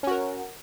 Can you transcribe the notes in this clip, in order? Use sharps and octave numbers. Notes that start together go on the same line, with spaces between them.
C#4 F#4 A#4